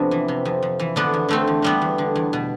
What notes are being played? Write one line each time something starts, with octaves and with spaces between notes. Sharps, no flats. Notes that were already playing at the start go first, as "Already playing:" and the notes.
Already playing: F2 C3 B3 D4
E3
C3
F2
F2
E3
D3 B3 D4
E2
D3 A3 C4
E2
D3 G3 B3
E2
D3
E2
B2